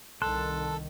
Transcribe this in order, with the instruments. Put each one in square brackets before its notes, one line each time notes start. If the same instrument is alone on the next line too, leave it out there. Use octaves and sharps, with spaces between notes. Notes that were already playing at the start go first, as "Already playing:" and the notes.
[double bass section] C2 D#3 [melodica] A4 [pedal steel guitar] A5 C6 F#6